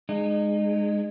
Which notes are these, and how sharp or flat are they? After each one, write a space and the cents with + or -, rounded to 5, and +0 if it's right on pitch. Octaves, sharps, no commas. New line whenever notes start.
G#3 +0 D#4 -30